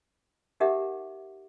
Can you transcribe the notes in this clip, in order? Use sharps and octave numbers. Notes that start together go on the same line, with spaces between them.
D#4 G4 A#4 E5 F#5 D6